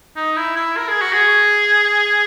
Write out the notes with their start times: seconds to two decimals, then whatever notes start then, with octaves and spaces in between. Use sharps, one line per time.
0.16 D#4
0.37 E4
0.56 E4
0.77 A#4
0.88 G#4
1.01 F#4
1.13 G#4